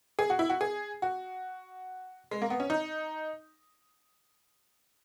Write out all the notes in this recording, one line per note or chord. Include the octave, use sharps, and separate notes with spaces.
G#4
F#4
E4
F#4
G#4
F#4
G#3
A#3
B3
C#4
D#4